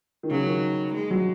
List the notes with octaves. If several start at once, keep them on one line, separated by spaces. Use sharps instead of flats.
D#3
C#3 F#3
D#3
G#3
F#3